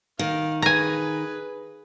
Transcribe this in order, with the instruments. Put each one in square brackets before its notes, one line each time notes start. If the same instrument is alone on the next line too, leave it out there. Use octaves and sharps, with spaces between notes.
[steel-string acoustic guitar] D#3 [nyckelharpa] F5
[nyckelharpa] G#4 B4 [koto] G#5 A#5